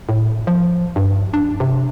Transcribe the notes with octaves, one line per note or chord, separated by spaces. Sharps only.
A2
F3
G2
D4
C3